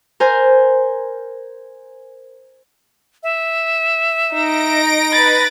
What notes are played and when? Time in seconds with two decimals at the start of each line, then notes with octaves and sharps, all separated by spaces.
0.20 A#4 C5 G#5
3.23 E5
4.34 D#4 A#6 D7
5.12 B4 B5 A6